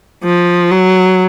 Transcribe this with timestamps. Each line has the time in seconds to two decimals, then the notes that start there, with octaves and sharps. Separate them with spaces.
0.24 F3
0.71 F#3